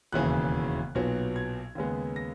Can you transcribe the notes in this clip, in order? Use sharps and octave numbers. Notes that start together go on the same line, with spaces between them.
E1 D#2 C#3 E3 F#6
B1 A#2 F#3 B3
G#6
D#2 C#3 G#3 B3
A#6